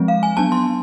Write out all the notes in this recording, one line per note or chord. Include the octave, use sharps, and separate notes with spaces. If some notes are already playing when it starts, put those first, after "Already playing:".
Already playing: F3 G#3 C4
F5
G#5
F#3 B3 D4 A5
C6